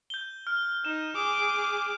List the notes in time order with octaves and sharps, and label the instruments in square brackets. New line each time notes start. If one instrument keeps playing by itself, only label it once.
[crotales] G6 G7
F6
[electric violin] D#4 [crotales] E7
[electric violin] G#4 D6 [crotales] D#6